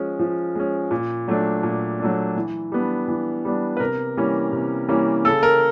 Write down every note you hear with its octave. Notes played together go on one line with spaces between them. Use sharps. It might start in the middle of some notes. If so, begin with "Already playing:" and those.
Already playing: F3 G#3 C#4
F3
G#3 C#4
A#2
F#3 A3 D4
A#2
F#3 A3 D4
E3
G3 B3 D4
E3
G3 B3 D4
B4
C3 A#4
E3 G3 A#3 C#4
C3
E3 G3 A#3 C#4
C#3 A4
A#4